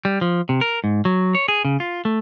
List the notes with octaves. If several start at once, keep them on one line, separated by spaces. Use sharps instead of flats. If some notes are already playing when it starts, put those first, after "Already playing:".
G3
F3
C3
A#4
G#2
F#3
C#5
G#4
C#3
F4
A3